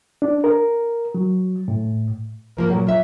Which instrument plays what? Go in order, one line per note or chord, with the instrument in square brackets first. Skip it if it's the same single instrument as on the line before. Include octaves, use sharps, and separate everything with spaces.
[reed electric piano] D4
A#4
F#3
A2
[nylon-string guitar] G#2 F3 A#3 [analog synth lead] A#4
[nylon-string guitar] A#2 [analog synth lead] F#3
[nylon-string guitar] F4 E5